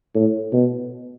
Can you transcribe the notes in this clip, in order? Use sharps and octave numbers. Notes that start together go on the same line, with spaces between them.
A2
B2